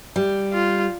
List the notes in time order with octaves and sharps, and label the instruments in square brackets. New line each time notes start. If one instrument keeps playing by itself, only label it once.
[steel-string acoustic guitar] G3
[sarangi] F4